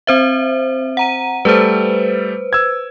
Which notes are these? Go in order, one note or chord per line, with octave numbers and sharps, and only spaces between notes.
C4 C5 E5
F#5 A#5 D#7
G3 A3 A4 B4 C5
E6 G#6